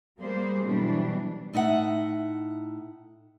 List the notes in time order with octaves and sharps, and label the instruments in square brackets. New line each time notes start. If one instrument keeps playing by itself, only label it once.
[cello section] G3 A#3 G#4 C5
B2 E3 F#3 G3 D4
[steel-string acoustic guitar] A2 D#4 E5 F#5